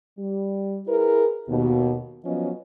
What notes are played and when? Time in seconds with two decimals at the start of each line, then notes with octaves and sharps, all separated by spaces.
0.18 G3
0.87 E4 G#4 A#4 B4
1.49 D#2 B2
2.24 F3 F#3 B3 C#4 D#5